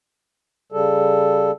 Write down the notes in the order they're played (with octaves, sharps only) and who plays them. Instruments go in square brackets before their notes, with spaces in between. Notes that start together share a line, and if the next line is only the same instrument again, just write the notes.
[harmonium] C#3 G3 A4